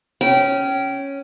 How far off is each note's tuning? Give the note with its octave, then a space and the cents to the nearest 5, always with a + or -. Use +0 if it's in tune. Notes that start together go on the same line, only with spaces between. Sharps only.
C#4 +0 G5 -25